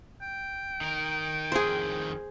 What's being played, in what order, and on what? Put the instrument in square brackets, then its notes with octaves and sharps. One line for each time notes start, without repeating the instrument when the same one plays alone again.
[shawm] G5
[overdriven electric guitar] D#3 A#4
[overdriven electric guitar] F2 D#3 [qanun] G#4 C5